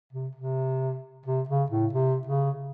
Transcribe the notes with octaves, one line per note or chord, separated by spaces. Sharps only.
C3
C3
C3
C#3
A2
C3
C#3